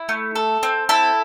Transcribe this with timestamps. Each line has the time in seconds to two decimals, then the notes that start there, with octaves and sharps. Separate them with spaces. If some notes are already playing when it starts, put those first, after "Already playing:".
Already playing: E4
0.09 A3
0.35 A4
0.63 C4
0.89 E4 A4